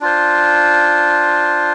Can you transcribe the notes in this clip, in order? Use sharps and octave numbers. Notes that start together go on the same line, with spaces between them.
D4 F4 C5